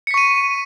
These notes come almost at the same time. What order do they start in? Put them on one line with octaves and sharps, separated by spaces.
C#7 B6 C#6 D#7